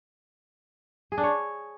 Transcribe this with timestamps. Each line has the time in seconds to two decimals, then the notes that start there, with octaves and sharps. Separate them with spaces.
1.12 G#4
1.18 D4
1.23 C#5